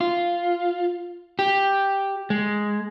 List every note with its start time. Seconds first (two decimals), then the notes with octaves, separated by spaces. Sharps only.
0.01 F4
1.39 G4
2.30 G#3